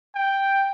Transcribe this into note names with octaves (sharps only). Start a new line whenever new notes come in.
G5